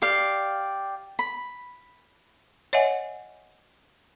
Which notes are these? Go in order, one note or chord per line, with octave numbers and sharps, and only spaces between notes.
G4 D5 F5
B5
C#5 D#5 E5 F#5 G#5